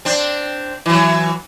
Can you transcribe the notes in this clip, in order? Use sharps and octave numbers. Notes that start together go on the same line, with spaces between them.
C4 D4
E3 F#3